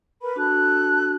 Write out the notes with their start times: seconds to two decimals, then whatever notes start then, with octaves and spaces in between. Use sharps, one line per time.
0.21 A#4 B4 B5
0.36 D4 F#4 A4 F#6